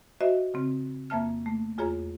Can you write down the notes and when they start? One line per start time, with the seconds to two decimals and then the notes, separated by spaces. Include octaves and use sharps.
0.21 F#4 C5 D#5 E5
0.54 C#3 C4
1.10 F2 A#3 E5 A5 F6
1.46 A3
1.78 E2 F4 G#4 C#5 A#5